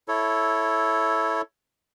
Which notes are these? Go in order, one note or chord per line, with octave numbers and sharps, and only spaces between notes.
E4 A4 C#5